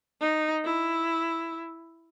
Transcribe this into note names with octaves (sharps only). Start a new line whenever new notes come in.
D#4
E4